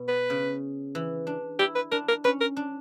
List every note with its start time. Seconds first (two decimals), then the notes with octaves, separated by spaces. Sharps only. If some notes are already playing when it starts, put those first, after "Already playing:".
Already playing: B2
0.08 B4
0.30 C#3
0.95 E3
1.27 D4
1.59 E4 G4
1.75 B4
1.91 D4 A#4
2.08 A#4
2.24 C#4 B4
2.40 A#4
2.57 D4